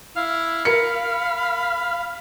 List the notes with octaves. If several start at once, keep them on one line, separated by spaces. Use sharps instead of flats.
E4 F5
A#4 B5 C#7